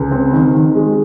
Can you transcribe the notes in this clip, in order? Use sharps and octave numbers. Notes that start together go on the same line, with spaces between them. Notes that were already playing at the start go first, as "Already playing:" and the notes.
Already playing: C#2
C4
D#3
D#3
G#3